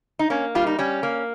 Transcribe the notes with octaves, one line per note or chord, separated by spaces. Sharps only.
D#4
A#3 C#4
G3 F4
D#4
G3 C#4
A#3